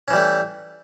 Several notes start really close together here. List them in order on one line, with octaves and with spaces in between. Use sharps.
C#4 E3 G3 A3